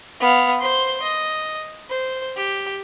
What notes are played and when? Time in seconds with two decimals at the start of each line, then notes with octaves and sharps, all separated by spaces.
0.21 B3 F5
0.61 C5 C6
1.02 D#5
1.90 C5
2.36 G4